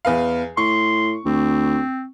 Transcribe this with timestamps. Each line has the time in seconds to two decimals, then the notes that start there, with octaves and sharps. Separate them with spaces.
0.05 E2 B4 F5
0.57 A2 C6 C#6
1.25 D2 C4